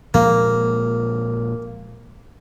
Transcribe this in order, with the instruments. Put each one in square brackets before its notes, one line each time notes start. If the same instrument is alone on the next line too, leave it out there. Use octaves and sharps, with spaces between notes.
[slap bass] A#2 F3 G#3 [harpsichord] A#3